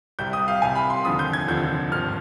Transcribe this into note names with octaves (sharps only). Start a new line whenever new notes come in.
C2 C3 G3 G6
D#6
F5
C2 C3 G3 G#5
B5
C6
F1 D#2 D3 F3 D#6
G6
G#6
F1 D#2 D3 F3 G6
G#1 G2 F3 F6